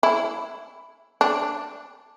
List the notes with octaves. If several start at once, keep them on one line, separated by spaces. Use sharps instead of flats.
E4
D4